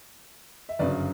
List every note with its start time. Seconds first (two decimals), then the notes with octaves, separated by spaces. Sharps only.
0.69 E5
0.79 G1 F#2 C#3 B4 D5